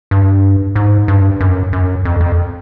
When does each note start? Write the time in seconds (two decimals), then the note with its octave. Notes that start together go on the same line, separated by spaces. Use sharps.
0.11 G2
0.75 G#2
1.08 G2
1.40 F#2
1.73 F#2
2.05 F2
2.21 F2